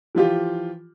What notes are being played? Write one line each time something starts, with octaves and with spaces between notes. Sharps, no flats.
E3 F3 F4 G4